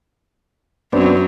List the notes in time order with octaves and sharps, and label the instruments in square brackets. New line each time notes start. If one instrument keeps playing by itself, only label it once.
[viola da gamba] F#2 F#3 [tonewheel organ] B3 C4 D4